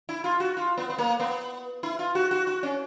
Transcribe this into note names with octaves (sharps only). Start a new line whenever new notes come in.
E4
F4
F#4
F4
B3
B3
A#3
B3
E4
F4
F#4
F#4
F#4
C#4